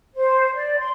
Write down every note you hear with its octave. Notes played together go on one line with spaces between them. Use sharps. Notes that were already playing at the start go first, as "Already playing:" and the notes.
C5
D5
C6